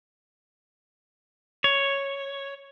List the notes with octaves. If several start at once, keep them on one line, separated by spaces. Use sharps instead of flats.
C#5